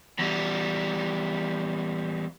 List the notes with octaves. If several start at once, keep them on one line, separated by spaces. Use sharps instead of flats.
E2 G3